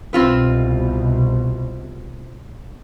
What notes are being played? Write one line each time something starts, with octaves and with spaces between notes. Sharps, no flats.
C2 B2 C4 F4 B4